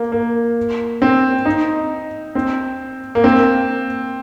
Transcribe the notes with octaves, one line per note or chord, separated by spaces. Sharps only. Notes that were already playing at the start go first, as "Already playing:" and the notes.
Already playing: A#3
A#3
C4
D#4
C4
A#3
C4